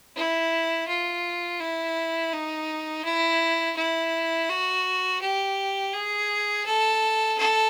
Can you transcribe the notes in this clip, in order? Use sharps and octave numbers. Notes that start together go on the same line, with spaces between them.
E4
F4
E4
D#4
E4
E4
F#4
G4
G#4
A4
A4